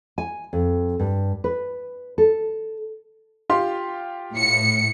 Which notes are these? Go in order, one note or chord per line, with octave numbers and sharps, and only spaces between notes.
G#5
F2
G2
B4
A4
F4 G4 C6
A2 C#7